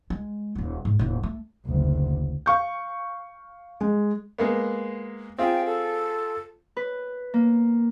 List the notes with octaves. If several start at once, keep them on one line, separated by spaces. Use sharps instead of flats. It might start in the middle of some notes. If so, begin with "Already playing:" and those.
G#3
D#1 C2
G#2
D#1 A2
A3
F#1 D2
F5 C#6 G6
G#3
G#3 A#3 B3
C4 F4 G#4 G5
A4
B4
A#3